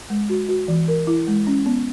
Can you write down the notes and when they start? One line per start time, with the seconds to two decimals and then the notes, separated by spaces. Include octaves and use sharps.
0.10 G#3
0.30 F#4
0.49 F#4
0.68 E3
0.88 A#4
1.07 E4
1.27 G#3
1.47 C#4
1.66 B3